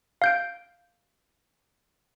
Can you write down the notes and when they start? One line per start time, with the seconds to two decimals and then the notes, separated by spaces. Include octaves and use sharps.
0.22 F5 G6 D7